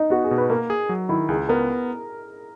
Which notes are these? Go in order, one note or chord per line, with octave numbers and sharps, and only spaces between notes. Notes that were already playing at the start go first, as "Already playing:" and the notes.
Already playing: D#4
B3 F#4
G#4
B2
B4
A#3 A#4
G#4
F#3
D#3 E4
C#2 G#4
B3 A#4